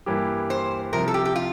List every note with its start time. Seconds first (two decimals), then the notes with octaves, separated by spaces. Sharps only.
0.06 G2 E3 A#3 E4 G4
0.50 C5
0.93 C2 C3 F3 A#4
1.08 A4
1.14 G4
1.25 G4
1.36 F4